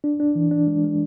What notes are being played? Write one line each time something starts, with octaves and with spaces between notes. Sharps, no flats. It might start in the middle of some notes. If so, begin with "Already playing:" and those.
D4
D4
E3
D4
G#3
G#3